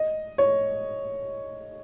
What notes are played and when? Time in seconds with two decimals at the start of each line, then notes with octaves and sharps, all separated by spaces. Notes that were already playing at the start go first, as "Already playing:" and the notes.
Already playing: D#5
0.38 C#5